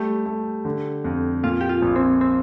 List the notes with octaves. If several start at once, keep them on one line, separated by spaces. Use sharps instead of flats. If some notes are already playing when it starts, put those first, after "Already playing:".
Already playing: G3 A3 G4
A3
D3
F2
A#2 F4
G4
F4
A#1
C4
C4